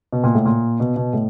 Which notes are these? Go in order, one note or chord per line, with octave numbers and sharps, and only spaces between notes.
B2
A#2
A2
A#2
B2
B2
A2